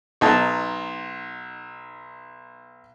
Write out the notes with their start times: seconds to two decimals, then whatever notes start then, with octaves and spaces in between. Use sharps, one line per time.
0.21 B1 D#4 A5